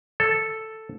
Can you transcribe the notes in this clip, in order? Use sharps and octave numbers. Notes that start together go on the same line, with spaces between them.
A4